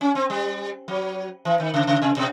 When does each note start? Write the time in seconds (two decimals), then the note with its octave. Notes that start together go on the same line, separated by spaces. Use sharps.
0.01 C#4
0.15 C4
0.30 G3
0.88 F#3
1.45 E3
1.60 D#3
1.74 C#3
1.87 C#3
2.02 C3
2.17 B2